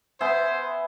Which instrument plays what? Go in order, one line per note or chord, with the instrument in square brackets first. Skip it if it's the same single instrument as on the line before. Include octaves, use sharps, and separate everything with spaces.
[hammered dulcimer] B3 E5 G#5 [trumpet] C5